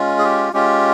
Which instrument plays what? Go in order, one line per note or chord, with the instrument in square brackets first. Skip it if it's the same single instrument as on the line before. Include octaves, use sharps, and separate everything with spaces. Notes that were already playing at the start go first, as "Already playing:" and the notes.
Already playing: [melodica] G#3 C#4 F4
G#4
G4
G#3 C#4 F4 G4